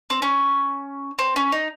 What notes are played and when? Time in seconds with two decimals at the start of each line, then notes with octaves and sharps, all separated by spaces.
0.10 C4
0.22 C#4
1.19 C4
1.36 C#4
1.52 D#4